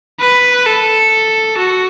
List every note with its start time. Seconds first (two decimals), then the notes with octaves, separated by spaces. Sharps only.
0.21 B4
0.67 A4
1.58 F#4